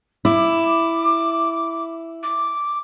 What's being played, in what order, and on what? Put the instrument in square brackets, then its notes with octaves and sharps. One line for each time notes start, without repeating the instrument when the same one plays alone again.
[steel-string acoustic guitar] E4 [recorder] D6
[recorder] D6